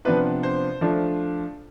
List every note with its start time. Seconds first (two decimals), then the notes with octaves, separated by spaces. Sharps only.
0.05 C3 F3 B3 D4 F4 B4
0.43 C5
0.81 F3 A3 D4 F4